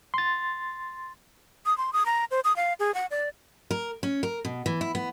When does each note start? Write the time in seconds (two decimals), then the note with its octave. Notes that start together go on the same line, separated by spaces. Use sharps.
0.14 C6 A6
1.66 D#6
1.78 C6
1.93 D#6
2.06 A#5
2.31 C5
2.45 D#6
2.56 F5
2.80 G#4
2.95 F#5
3.11 D5
3.71 A#4
4.03 C#4
4.23 A#4
4.45 B2
4.66 E3
4.81 E4
4.95 B3